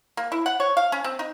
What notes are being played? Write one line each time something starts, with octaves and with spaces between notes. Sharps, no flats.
A#3
E4
F#5
C#5
F5
C#4
C4
D#4